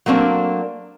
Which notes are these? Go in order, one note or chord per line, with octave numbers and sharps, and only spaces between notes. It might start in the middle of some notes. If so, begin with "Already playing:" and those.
F#3 A3 A#3 C4 D4